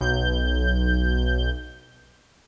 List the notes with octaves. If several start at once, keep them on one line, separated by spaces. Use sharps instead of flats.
B1 G6